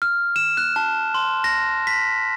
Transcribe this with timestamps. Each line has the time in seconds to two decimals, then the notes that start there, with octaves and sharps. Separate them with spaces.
0.02 F6
0.36 E7
0.57 F#6
0.76 A5
1.14 C6
1.44 A#6
1.87 B6